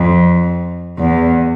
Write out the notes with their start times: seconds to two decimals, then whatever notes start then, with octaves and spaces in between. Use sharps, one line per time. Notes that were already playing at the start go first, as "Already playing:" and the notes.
Already playing: F2
0.98 E2